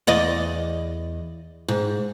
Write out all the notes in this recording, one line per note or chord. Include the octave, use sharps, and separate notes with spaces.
E2 D5 D#5
G#2